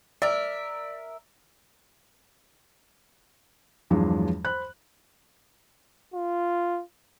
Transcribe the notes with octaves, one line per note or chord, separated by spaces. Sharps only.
A#4 D5 E5
E2 G2 F3 F#3 G#3 D4
C5 B5 F#6
F4